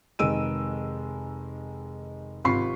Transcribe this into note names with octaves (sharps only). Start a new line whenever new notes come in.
F1 D#3 G#3 E6 D7 D#7
G#1 C3 F4 B5 C#6 C7